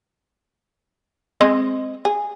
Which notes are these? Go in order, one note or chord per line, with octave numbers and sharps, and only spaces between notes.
G#3 C4 D#5
G#4